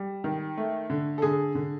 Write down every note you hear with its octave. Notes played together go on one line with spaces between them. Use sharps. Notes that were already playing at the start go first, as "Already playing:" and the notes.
Already playing: G3
D#3
A3
D3
A4
D3 G#4
D3